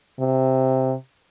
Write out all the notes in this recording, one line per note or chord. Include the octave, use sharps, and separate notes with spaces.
C3